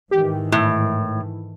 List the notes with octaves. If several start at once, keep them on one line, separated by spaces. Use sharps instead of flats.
G#2 D#3 E3 G4
A2 E4